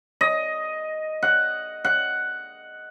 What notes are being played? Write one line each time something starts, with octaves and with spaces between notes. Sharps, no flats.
D#5
F#5
F#5